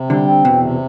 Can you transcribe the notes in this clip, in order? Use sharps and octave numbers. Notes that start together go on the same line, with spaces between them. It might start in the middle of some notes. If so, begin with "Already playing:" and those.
Already playing: C3
D3 G3
C4
E2 B2
C3